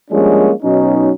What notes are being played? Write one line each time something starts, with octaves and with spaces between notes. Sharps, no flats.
F3 G3 G#3 A#3 C#4 D4
B2 F#3 C#4 D#4